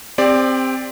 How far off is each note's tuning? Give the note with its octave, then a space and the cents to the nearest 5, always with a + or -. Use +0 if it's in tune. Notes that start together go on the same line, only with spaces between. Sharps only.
C4 +0 G4 +30 D5 +0